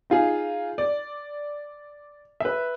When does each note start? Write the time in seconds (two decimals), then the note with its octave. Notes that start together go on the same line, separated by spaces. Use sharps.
0.10 D#4 F4 G#4
0.78 D5
2.40 B4 E5